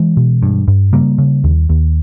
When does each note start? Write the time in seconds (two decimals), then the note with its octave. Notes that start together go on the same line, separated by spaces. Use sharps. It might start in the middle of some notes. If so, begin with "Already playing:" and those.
Already playing: E3 G#3
0.17 B2
0.43 G2
0.68 G2
0.93 C#3 G3 A#3
1.18 C#3
1.44 D#2
1.69 D#2